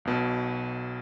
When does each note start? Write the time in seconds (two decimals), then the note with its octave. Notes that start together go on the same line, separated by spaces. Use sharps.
0.05 B1 B2